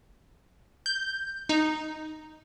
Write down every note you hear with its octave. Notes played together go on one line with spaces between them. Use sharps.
G6
D#4